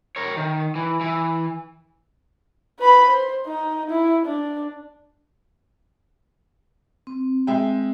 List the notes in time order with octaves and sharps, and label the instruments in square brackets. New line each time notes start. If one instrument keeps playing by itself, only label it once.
[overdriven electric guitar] A#4 C#5
D#3
E3
E3
[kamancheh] B4 B5
C5
D#4
E4
D4
[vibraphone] C4
[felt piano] G#3 E5 G5